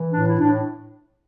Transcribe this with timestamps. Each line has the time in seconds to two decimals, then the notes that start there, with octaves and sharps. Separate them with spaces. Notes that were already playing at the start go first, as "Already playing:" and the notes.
Already playing: E3
0.13 A2 D4
0.27 E4
0.40 A2 D4